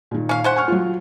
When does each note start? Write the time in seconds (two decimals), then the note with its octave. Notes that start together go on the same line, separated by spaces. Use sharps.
0.11 A#2 D#3
0.29 C#4 F5
0.44 C#4 C5 F#5
0.56 G#5 C#6 F6
0.68 F#3 F4